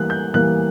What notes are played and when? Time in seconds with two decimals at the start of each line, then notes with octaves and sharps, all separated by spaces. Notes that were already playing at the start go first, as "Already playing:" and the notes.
Already playing: E3 G3 A#3 F#6
0.10 G6
0.34 E3 G3 A#3 F#6